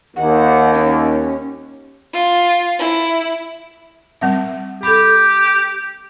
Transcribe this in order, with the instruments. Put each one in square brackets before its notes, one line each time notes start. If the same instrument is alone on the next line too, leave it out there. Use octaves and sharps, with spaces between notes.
[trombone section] D#2 [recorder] F#5
[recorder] C#4
[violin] F4
E4
[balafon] G3 C4 E5
[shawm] G4 [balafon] A4 B5